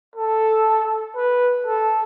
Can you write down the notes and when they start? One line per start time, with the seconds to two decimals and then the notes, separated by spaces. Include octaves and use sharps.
0.16 A4
1.16 B4
1.66 A4